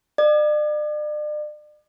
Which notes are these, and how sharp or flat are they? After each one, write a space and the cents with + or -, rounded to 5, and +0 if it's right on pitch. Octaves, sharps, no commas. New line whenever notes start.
D5 +40